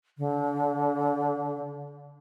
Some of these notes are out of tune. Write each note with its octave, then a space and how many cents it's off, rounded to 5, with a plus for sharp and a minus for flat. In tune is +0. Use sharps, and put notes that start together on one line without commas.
D3 -30